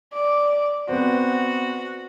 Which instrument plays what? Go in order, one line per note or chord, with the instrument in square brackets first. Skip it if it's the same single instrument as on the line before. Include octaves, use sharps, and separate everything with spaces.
[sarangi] D5
[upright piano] B3 C4 [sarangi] F#4